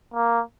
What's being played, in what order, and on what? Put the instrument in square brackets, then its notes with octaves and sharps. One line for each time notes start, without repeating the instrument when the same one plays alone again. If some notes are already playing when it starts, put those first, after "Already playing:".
[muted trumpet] A#3